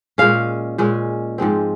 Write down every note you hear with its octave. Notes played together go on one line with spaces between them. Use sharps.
A#2 G#3 C#4 F5
A#2 G#3 C#4
G#2 F3 G#3 C4